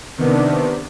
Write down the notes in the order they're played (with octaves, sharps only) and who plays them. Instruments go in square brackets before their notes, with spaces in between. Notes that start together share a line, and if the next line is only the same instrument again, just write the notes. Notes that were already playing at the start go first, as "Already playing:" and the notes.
[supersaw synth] C3 D#3 B3 D4